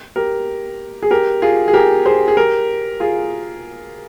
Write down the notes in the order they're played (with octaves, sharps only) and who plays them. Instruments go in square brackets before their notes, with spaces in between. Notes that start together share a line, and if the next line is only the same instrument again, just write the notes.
[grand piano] G4 A#4
G#4
G4 A#4
F4 G#4
G#4
G4 A#4
G#4 C5
G#4
G4 A#4
F4 G#4